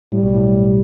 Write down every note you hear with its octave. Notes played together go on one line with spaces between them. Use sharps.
A2 G3
B1 B2
A2